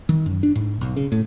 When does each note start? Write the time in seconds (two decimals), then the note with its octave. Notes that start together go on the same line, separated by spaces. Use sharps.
0.09 D#3
0.26 F#2
0.43 D4
0.56 G#2
0.81 B1
0.96 C#3
1.12 A2